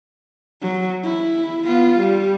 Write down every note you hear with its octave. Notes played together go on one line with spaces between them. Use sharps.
F#3
E4
B3 F4
G3